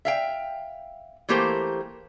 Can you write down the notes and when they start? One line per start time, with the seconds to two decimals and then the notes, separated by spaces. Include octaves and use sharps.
0.05 E5 F5 G5
1.29 E3 A3 A#3 G4 A#4 C5